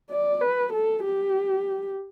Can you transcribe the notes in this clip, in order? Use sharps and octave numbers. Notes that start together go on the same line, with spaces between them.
D5
B4
A4
G4